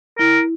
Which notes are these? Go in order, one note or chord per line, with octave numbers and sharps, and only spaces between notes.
E4 A#4